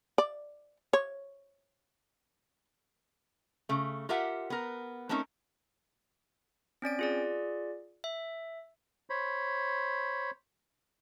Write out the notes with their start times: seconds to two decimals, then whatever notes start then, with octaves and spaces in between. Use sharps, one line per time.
0.18 D5
0.93 C#5
3.69 C#3 A3
4.09 F4 G4 A#4 E5 F#5
4.50 B3 A#4
5.09 A3 C4 C#4 D#4 A#4
6.82 C4 C#4 D5 D7
6.99 F4 G#4 D5
8.04 E5
9.10 C5 C#5 B5